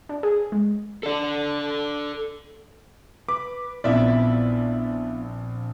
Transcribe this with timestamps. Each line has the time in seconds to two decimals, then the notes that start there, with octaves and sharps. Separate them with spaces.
0.09 D4
0.23 G#4
0.52 G#3
1.03 A4 D5
3.29 B4 D6
3.84 A#1 B3 C4 E4 F4 B4 D5 E5